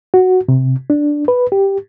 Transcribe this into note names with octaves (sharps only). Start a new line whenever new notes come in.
F#4
C3
D4
B4
G4